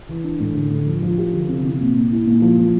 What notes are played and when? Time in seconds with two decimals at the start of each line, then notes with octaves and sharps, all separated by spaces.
0.09 E3
0.24 D4
0.40 A2
0.55 D3
0.70 D3
0.87 F3
1.02 F3
1.18 G4
1.33 D3
1.48 C3
1.65 C3
1.80 A#2
1.95 A#2
2.10 E4
2.27 A#2
2.42 F3
2.57 F3